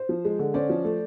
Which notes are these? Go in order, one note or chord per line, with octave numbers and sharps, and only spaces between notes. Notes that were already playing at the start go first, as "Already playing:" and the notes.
Already playing: C5
F3
G#3
D3
C#4 C5 D5
F3
A3